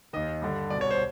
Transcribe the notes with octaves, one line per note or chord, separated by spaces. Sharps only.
D#2 D#3 D#5
G2 D3
C2 B2 D5
C#5
C5